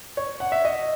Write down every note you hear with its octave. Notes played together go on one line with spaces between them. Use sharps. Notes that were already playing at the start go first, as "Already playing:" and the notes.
C#5
F#5
E5
D#5